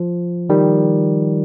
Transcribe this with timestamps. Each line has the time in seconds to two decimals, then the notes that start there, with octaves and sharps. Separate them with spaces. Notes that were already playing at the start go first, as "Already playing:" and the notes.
Already playing: F3
0.49 D#3 G3